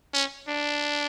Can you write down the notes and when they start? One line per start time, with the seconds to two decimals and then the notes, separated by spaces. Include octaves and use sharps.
0.14 C#4
0.49 D4